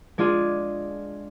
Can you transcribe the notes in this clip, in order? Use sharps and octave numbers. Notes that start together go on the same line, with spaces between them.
G#3 D4 F4 G#4